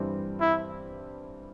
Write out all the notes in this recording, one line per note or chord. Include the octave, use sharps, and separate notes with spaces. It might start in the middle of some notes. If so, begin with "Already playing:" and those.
Already playing: G2 E3 G3 C4
E4